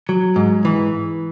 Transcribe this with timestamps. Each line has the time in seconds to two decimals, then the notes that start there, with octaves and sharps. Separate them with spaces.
0.09 F#3
0.36 G#2
0.65 E3